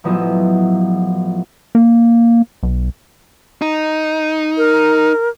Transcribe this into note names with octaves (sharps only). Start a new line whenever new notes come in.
A1 F3 F#3 B3 D#5 E5
A#3
B1
D#4
A#4